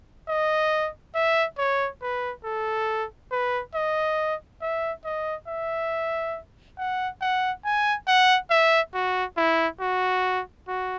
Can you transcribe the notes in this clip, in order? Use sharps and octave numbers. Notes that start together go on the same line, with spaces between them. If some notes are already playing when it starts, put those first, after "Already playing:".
D#5
E5
C#5
B4
A4
B4
D#5
E5
D#5
E5
F#5
F#5
G#5
F#5
E5
F#4
E4
F#4
F#4